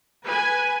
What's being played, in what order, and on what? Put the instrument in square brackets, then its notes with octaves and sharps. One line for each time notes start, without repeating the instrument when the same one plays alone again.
[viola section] B4 G#5